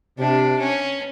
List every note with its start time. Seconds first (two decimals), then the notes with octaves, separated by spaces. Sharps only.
0.18 C3 D4
0.59 C#4